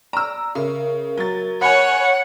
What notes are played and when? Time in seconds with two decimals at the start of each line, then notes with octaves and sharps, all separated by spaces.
0.13 D5 A#5 E6
0.55 C#3 A#4 E5
1.17 F#3 A6
1.61 C#5 F#5 G#5 B5